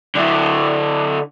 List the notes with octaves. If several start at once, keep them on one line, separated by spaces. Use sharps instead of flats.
D3 E4